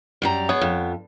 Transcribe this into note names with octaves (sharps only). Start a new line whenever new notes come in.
F#2 G3 A#5
B2 B3 G#4 C#5
F2